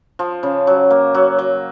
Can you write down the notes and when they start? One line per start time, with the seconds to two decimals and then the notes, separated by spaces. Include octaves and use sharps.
0.19 F3
0.43 C#3
0.67 F#3
0.90 A#3
1.15 F#3
1.38 F#3